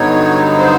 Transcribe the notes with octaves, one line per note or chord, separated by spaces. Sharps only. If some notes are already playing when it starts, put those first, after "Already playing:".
Already playing: G2 D3 F#3 B3 D#4 C#5
C5